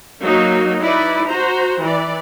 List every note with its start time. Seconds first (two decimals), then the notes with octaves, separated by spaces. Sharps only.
0.23 F#3 A#3 D#4
0.81 D#4 E4 B4 D5
1.29 F#4 C5 A#5
1.84 E3 D5